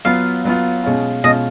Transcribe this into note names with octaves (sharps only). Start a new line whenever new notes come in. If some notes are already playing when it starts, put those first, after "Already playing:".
F#3 B3 F4 F5
F#3 B3 F4
B2 G#3 C#4 F4
B2 G#3 C#4 F4 D#5